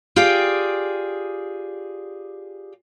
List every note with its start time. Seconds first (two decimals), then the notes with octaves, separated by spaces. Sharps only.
0.16 F4 G4 G#4 D5 G5